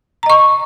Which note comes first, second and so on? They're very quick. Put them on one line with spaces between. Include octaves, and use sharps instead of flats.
A#5 D#5 C#6